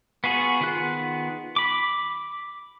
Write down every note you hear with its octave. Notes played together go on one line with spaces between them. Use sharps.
B3 F4 F#4 G#4
D#3 B3 F4 G#4 F#6
B5 D6